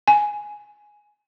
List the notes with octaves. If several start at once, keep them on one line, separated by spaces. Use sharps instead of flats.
G#5